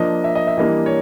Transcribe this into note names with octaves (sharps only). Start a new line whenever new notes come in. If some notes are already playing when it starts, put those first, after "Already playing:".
Already playing: F3 A#3 D4 D#5
E5
D#5
E5
E3 G3 A#3 D4 D#5
C#5